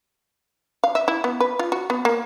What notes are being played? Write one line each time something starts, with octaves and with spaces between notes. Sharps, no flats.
F5
E5
E4
B3
B4
F4
F#4
B3
A#3